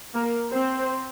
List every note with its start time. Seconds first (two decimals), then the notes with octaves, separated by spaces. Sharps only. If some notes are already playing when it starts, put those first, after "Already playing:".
0.15 A#3 A#4
0.51 C4 C5